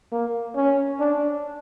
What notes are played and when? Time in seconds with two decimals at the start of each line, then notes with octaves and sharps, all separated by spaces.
0.12 A#3
0.56 C#4
0.99 D4